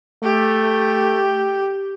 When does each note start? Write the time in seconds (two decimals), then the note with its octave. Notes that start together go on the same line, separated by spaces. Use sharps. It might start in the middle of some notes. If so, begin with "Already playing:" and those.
0.23 A3 G4